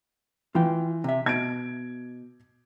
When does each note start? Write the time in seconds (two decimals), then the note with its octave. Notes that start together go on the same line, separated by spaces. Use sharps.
0.55 E3 F4 G5
1.04 C3 E5
1.26 B2 G#6 D7